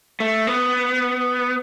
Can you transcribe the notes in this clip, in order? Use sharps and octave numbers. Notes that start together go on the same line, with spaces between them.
A3
B3